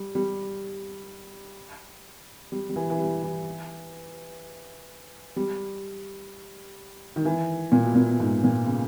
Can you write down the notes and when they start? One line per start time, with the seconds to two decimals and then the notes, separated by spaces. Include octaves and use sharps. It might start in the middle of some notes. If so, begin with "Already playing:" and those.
Already playing: G3
0.15 G3
2.52 G3
2.70 G3
2.76 E3
2.90 E3
3.00 G3
3.23 E3
5.36 G3
7.16 D#3
7.25 E3
7.72 A#2
7.84 B2
7.95 A#2
8.20 G#2
8.43 A#2
8.67 C#3